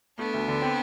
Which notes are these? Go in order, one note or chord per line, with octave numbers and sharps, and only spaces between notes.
A3 B3 D4
D2
D3
C4